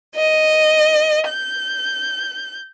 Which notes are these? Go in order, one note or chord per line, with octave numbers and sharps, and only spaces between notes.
D#5
G6